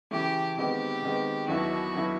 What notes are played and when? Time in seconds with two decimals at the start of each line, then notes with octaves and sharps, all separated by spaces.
0.11 C#3 E3 A3 G4
0.57 C3 D#3 G#3 B3 G4
1.02 C3 D#3 G#3 B3
1.48 D#2 D3 F#3 B3 E4 F#4
1.94 D#2 D3 F#3 B3 E4